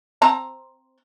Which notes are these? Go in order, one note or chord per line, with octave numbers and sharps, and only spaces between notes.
C4 A5 A#5